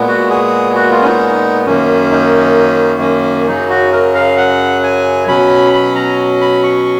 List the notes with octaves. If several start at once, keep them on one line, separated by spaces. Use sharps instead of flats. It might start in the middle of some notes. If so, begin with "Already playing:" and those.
Already playing: A#2 G#3 B3
F#4
G#4
F#4
F4
C#4
D#4
F#2 D#3 A#3 C#4
D#4
C#4
F#2 C#3 F#3 D#4
F#4
A#4
F5
F#5
G#5
B2 F#3 C#4 B5
B5
A#5
B5
C#6